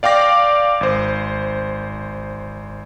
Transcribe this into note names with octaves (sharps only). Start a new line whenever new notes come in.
D5 F5 G5 D6 A#6
G#1 C5